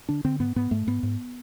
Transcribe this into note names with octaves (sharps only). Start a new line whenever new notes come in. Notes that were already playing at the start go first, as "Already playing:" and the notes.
D3 D4
D3 C4
G#2 B3
G#2 B3
G#2 A3
G#2 B3
G#2